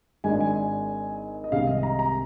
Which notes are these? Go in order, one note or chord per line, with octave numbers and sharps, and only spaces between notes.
G#1 G#2 D#3 G#3 D4 G#5
G#5
D#5
C2 C3 D#3 G#3 F5
D#5
A#5
A#5